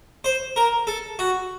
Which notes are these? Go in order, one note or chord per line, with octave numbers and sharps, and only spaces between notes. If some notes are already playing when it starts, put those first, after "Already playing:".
C5
A#4
A4
F#4